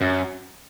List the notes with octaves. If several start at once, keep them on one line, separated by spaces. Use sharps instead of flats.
F#2